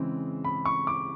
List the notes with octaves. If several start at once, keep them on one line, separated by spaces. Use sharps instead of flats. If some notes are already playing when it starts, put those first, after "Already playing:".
Already playing: C#3 E3 G#3 C4
B5
C#6
D6